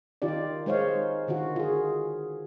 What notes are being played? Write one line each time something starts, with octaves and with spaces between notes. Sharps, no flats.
D#3 D#4 F4 G4 D5
G#3 D#4 C5 C#5 F5
D3 D#3 F4 F#4
F4 G#4